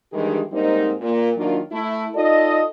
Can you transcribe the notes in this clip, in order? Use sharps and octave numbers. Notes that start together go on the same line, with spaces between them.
G2 D#3 E3 G#3 G4 G#4
G#2 G3 A#3 C4 D#4
A#2 A#3
D#3 F#3 A#3 D4 F4
A3 E4
D#4 F4 A4 D5 D#5